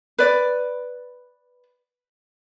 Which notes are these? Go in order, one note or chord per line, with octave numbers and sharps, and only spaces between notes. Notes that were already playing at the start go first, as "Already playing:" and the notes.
B4 D5